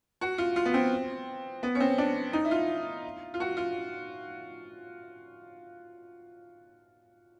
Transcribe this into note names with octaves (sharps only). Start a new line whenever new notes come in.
F#4
F4
F4
B3
C4
B3
C#4
C4
D4
D#4
E4
F4
F4
F#4
F4